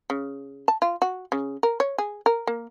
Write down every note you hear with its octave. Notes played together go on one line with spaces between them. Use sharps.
C#3
A5
F4
F#4
C#3
A#4
C#5
G#4
A#4
A#3